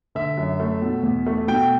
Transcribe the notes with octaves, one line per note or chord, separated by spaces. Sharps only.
D3 E5
F#2
A3
B2
E2
A3
B2 G5